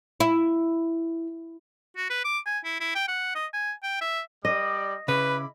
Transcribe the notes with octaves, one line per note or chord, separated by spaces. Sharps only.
E4
F#4
B4
D6
G#5
E4
E4
G5
F#5
D#5
G#5
G5
E5
G3 D5 D#5 D6
C#3 E4 B4 B5 D6